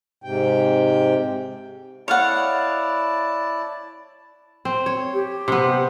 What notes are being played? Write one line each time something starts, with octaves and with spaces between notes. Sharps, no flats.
G#2 C3 G5
E4 C#5 D5 F5 F#5 A5
C4
C#5
G4
C3 B3